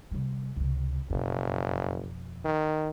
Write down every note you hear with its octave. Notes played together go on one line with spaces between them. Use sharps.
C3 G3
C#2 C3
F#1 F2 B2
D#3